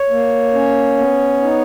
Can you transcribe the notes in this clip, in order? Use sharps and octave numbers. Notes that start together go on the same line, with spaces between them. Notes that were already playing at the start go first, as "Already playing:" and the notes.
Already playing: C#5
A#3
C#4
B3
D#4